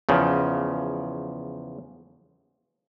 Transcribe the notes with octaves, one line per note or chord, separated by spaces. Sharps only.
E2 C#3 F3